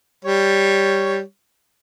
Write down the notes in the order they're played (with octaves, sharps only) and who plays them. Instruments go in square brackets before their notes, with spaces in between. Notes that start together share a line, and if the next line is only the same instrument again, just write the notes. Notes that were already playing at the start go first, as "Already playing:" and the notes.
[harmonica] G3 C#5